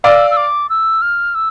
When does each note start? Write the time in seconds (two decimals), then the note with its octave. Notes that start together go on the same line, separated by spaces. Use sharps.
0.04 D5 F5 E6
0.31 E6
0.37 D6
0.70 E6
1.02 F6
1.35 E6